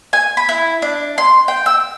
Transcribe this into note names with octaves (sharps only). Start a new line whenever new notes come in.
G#5
B5
E4
D4
C6
G5
E6